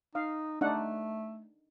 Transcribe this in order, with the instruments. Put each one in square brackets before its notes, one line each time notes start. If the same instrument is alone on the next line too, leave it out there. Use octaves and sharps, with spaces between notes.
[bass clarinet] D#4 [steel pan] F5
[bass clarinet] A3 [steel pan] D4 D#4 F#5